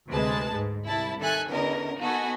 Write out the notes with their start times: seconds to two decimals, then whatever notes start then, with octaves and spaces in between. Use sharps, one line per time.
0.10 D2 C3 G#3 B4 A5
0.55 G#2
0.85 C2 E4 A5
1.20 D#3 A4 E5 G#5 F#6
1.49 E2 D3 C#4 A#4 D#5
1.99 B3 D#4 F#4 A4 D#5 G#5